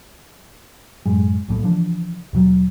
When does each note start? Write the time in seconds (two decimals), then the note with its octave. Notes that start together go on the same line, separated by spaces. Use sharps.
1.06 F#2 A2 G#3
1.48 B1 A2 A3 B3
1.62 C#3 E3 F3 D4
2.33 D#2 B2 F#3